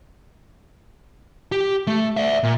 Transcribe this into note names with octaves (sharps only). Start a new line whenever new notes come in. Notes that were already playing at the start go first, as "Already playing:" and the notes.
G4
A3
D5 E5
A#2